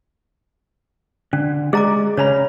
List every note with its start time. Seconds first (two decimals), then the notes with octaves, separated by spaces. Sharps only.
1.33 D3 C#4
1.73 G#3 G#4 D5 A#5 D6
2.17 C#3 C#4 C#5 A#5 B5